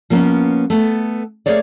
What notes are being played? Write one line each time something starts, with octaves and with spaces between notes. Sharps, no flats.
F3 A#3 B3 C#4
A3 B3 A4
A3 A#3 G#4 C#5 D5